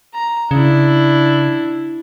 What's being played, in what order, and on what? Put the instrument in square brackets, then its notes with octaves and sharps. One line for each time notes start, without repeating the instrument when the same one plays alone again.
[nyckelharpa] A#5
[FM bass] C#3 [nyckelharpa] D4 E4